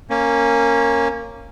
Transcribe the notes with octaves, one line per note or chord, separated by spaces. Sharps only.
A#3 C#4